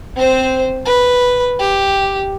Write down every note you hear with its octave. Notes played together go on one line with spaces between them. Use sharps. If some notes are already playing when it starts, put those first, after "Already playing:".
C4 C5
B4
G4